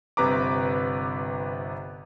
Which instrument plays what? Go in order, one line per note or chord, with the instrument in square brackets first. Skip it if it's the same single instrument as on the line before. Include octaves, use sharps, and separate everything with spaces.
[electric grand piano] G1 C3 B4 A#5 D6